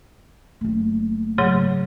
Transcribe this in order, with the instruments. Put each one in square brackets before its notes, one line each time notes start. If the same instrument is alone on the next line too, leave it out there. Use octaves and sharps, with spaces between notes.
[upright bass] F#1 A3
[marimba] G#2 C#3 F#3